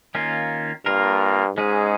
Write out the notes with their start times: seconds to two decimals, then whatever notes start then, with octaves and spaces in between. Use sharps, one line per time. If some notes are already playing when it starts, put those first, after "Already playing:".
0.15 D#3 A#3 C#4 F4
0.86 G2 A#3 F4 A#4
1.57 G#2 G#3 C#4 G#4